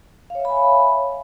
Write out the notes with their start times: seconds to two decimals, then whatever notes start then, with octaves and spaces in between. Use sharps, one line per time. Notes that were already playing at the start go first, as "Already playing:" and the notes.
0.30 F5
0.35 C#5
0.40 E5
0.45 B5
0.50 G#5